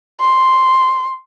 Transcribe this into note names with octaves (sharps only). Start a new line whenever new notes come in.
C6